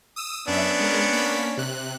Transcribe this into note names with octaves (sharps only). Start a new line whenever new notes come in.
D#6 E6
F#2 B3 C#4 D4 E5
G#3 A#4
A#3 B6
C3 F#6